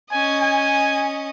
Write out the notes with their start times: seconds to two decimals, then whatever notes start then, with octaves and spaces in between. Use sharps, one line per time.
0.12 C#4 D#5 G#5
0.41 G#5